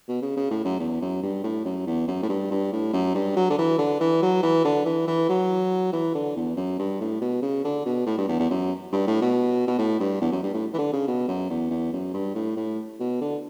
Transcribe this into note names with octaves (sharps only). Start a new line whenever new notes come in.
B2
C#3
C#3
A2
F#2
E2
F#2
G2
A2
F#2
E2
F#2
A2
G2
G2
A2
F#2
G2
F#3
D3
E3
D3
E3
F#3
E3
D3
E3
E3
F#3
E3
D3
E2
F#2
G2
A2
B2
C#3
D3
B2
A2
G2
E2
E2
F#2
G2
A2
B2
B2
A2
G2
E2
F#2
G2
A2
E3
D3
C#3
B2
F#2
E2
E2
F#2
G2
A2
A2
B2
D3